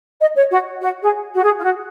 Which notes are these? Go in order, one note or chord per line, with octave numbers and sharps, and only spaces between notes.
D#5
C#5
F#4
F#4
G#4
F#4
G#4
F4
F#4